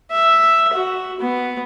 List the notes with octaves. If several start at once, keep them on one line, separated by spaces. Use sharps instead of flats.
E5
F#4
B3